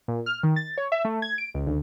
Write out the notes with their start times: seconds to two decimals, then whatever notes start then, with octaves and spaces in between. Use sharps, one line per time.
0.08 A#2
0.26 F6
0.43 D#3
0.56 A6
0.78 C#5
0.92 E5
1.05 A3
1.22 G#6
1.38 D7
1.54 C#2
1.67 D2